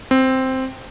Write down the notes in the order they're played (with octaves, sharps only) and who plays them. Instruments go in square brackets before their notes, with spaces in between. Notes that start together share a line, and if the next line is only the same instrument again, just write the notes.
[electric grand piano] C4